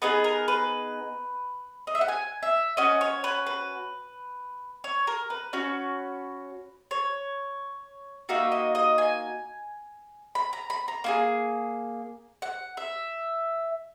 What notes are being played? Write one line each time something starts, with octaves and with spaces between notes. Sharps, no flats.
B3 D#4 G#4 B4
A#4
B4
D#5
E5
F#5
G#5
E5
C#4 F#4 D#5
C#5
B4
B4
C#5
A#4
B4
C#4 F#4
C#5
A#3 D#4 F#4 E5
D#5
D#5
G#5
B5
A#5
B5
A#5
A#3 E4 G#4
F#5
E5